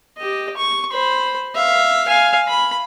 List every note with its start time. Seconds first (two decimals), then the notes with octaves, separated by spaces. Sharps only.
0.18 G4 D#5
0.57 C#6
0.92 C5 B5
1.55 E5 F5
2.07 F5 G#5
2.48 B5